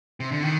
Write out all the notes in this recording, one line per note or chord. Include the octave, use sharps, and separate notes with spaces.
C3
D3
D#3